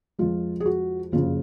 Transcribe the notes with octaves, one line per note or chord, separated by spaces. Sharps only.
F2 F3 G#3 F4
G#4
F#4
F#1 F2 C#3 F4